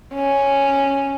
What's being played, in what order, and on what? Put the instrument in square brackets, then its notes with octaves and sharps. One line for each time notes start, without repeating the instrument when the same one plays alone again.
[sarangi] C#4